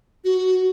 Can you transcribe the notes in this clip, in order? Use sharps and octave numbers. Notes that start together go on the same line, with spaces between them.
F#4